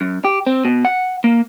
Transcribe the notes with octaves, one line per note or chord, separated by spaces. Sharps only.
F#2
G4
C4
B2
F#5
A#3